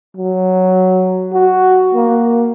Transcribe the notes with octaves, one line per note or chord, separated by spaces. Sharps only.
F#3
F#4
A#3